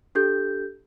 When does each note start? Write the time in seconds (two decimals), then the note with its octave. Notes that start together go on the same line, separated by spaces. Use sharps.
0.15 D4 G4 A4 G6